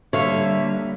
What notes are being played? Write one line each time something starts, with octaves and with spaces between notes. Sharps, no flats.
D3 G3 A#3 C#5 E5 F5